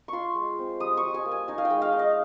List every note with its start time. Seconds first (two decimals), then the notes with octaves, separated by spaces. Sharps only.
0.08 F4 C6 C#6
0.35 G#3
0.59 C4
0.80 G3 D#6
0.97 C#6
1.03 G3
1.14 G#5
1.26 A#3
1.31 G#5
1.48 D#4 G#5
1.58 F5
1.65 G5
1.70 G#3
1.82 F5
1.93 D#4
1.99 D#5